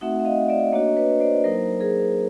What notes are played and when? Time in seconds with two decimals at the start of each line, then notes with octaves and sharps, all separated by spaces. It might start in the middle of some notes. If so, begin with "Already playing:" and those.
0.01 A3 C4 D#4 F#4 E5 F#5
0.20 E5
0.25 D#5 F5
0.49 D5 E5
0.73 A#3 D4 F#4 C#5 D#5
0.97 B4 C#5
1.20 C5 D5
1.44 F#3 A#3 D#4 A#4 C5
1.80 G#4 A#4